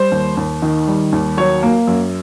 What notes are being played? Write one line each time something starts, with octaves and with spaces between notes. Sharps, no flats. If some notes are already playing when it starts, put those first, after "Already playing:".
Already playing: G3 C5
D#2
D#2
D#3
G3
D#2
F#3 C#5
A#3
F#2